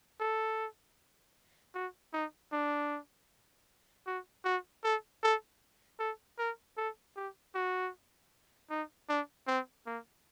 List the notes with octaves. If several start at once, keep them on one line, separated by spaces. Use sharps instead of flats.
A4
F#4
D#4
D4
F#4
F#4
A4
A4
A4
A#4
A4
G4
F#4
D#4
D4
C4
A#3